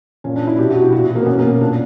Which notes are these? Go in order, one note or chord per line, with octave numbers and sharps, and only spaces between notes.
A#2 C#4
D4
E4
B2 G4
F#4
E4
A#2 F#4
F#4
A#3
B3
B2 C#4
A#3
A#2 D4